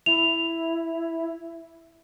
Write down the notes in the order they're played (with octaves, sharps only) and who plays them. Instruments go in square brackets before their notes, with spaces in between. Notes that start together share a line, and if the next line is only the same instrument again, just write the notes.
[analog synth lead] E4 [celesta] F7